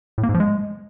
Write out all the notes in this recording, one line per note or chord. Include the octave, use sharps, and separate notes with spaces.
A2
A#3
G#2
F3
G#3